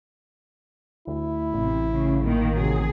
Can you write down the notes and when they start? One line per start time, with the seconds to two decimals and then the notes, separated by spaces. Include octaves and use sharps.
1.08 D2 E4
1.54 A1 C3
1.93 C#3
2.24 A#2 D#3 A#3
2.56 C3 F#3 G#4